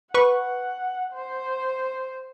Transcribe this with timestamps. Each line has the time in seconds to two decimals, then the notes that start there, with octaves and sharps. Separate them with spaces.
0.14 B4 F#5 C#6
1.13 C5